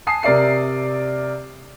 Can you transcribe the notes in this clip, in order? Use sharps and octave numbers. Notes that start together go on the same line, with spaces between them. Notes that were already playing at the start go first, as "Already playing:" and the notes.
G#5 A5 D#6 C7
C3 A#4 D5 E5 C7